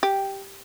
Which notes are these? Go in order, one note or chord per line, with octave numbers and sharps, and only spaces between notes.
G4